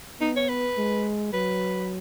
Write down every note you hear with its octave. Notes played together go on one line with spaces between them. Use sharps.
B3 D#4
C#5
B4
G#3
F#3 B4